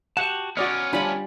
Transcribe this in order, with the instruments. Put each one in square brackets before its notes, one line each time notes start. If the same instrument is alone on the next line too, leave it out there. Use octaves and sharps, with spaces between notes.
[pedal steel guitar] F#4 G4 A5 [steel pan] F#5
[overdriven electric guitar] B3 C#4 [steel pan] F#4 D5 D#5 [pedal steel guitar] F6
[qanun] G3 G#5 [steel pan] D4 F4 B5